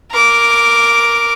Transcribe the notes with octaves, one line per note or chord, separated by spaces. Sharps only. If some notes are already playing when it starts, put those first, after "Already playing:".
A#4 D6